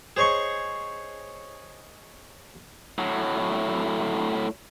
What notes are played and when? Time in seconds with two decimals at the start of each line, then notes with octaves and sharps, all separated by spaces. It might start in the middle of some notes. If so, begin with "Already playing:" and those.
0.17 G#4 C5 C#5 D#5 C#6
2.98 A2 F#3